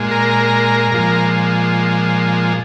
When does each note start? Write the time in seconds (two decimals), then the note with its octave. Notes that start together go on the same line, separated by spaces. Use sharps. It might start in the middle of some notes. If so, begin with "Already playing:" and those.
Already playing: A#2 G#3
0.11 A#4
0.92 A#2 F3 G#3